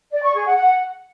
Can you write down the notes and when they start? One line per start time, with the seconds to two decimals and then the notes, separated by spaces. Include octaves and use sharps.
0.11 D5
0.23 C#6
0.34 G#4
0.46 F#5
0.57 F#5